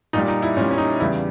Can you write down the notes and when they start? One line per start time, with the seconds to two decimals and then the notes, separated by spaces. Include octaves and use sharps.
0.13 A#2 G3 D#4
0.28 D#4
0.42 E4
0.57 A#2 C#4
0.61 G3
0.71 C#4
0.78 D#4
1.00 E2 C#3 G3 E4